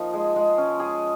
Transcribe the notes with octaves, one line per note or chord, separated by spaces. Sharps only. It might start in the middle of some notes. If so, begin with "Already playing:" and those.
Already playing: F3 A#3 D#4
G#3
G#3
C#4
G#4